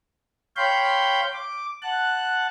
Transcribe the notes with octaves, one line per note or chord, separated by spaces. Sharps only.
C#5 F5 G5 B5 C6 G6
D6
F#5 A5 F#6